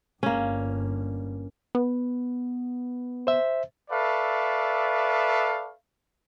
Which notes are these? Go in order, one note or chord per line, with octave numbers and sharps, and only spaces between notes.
G1 G2 A#3 C#4
B3
C5 E5
A4 B4 D5 E5 F5 C#6